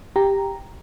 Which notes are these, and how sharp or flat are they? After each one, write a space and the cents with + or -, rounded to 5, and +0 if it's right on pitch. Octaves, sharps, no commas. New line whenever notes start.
G4 +5 A#5 +0